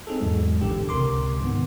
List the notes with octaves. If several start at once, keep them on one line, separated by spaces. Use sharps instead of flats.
C4 D#4 G#4 A4
E2 G#2 F#3 G#3
A1 D3 G4
C#2 C3 A#4 C6 D6
G#2 C3 D#3 B3